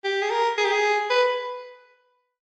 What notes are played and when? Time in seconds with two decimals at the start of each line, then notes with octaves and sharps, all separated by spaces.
0.04 G4
0.22 G#4
0.31 A#4
0.58 G#4
0.65 G4
0.72 G#4
1.10 B4